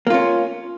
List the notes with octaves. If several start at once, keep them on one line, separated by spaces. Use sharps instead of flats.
A#3 C#4 F4